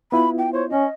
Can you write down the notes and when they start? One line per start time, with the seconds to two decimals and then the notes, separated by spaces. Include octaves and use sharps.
0.12 B3 E4 F4 B5
0.38 G5
0.53 C5 C#5
0.70 C#4 D#5